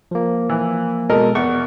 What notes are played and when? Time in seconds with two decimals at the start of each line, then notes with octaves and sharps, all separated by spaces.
0.11 F3 A#3
0.49 E3
1.09 B2 G#3 A4 A#4 D#5
1.35 E2 C#6